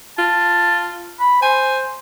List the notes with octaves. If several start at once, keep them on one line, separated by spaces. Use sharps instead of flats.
F4 A5
B5
C5 G#5